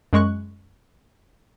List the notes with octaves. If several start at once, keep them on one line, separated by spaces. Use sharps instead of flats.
F#2 G#3 C#6 F#6